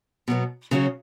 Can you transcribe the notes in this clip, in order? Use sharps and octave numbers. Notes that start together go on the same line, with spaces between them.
B2 F#3 B3
C#3 F#3 C#4 F#4